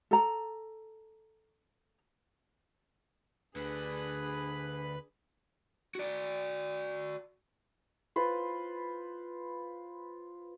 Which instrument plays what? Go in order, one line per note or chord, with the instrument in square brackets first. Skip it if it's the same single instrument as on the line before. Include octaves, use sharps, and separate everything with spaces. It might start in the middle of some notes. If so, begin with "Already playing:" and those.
[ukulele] A4 A#5
[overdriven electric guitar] D2 D3 [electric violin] D4 G#4 [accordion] B4 B5
[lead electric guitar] F#4 D5
[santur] F4 B4 C5